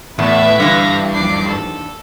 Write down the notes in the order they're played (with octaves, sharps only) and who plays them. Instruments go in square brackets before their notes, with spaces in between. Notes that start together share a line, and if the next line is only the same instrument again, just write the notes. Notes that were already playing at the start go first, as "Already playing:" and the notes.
[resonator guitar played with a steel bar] E2 [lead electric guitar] A2 [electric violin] B3 A5 [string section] E4 B4 E5
[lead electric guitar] G2 [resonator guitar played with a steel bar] D3 E3 [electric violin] F5 A#6
[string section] D#2 F3 [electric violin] D6 C7
[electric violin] A4